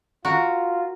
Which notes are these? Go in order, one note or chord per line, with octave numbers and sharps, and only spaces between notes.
F4 F#4 A#4